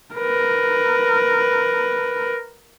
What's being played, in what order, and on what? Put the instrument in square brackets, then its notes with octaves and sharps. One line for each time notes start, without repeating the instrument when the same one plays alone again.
[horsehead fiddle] A#4 B4